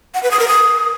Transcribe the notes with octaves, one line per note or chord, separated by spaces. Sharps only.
F#5
B4
D#6
A#4
D#6